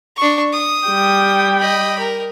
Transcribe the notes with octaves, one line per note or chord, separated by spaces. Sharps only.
D4 C#6
D#6
G3 G5
D#5 B5
A#4